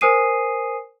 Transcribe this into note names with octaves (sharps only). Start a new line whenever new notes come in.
A#4 C5 G#5 D#6 C7 D#7